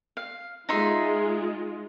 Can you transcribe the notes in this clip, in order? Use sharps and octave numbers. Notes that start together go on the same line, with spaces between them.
F5
G#3 D#4 F4 E5 C6